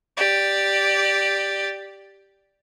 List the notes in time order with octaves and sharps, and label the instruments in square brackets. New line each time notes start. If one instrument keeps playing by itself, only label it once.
[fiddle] G4 D5